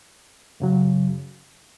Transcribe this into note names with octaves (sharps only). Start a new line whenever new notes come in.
F#2 C#3 F#3